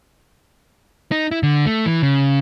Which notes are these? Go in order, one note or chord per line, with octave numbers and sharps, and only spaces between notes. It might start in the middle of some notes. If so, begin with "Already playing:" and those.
D#4
E4
D3
A3
E3
C#3